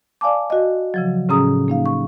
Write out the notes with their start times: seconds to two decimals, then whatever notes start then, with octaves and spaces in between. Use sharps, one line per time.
0.21 D5 F5 G#5 A5 D6
0.50 F#4 D#5
0.94 C#3 F3 F#3
1.29 A2 C#3 C#4 G#4 A#5 D#6
1.68 A#3 D#4 F5
1.86 C#6